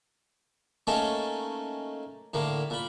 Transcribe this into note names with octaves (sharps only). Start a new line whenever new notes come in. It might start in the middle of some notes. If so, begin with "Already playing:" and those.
A3 A#3 C#4 D#4 A4
A2 D3 A#3
A#2 B5